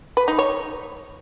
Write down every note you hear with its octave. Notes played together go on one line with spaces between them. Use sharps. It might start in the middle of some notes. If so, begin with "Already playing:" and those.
B4
D#4
C#5